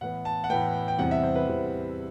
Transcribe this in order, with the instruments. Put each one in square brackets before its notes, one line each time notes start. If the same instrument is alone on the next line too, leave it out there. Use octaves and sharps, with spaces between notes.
[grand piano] A2 E3 B3 F#5
A5
F#5
A2 E3 B3 G5
G5
E2 C3 G3 C4 F#5
E5
C5
B4
E2 C3 G3 C4